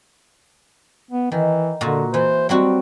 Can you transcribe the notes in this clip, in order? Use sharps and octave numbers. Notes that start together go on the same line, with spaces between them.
B3
D#3 E3
A#2 D3 F#4
E3 C5
F#3 G3 C4 F#4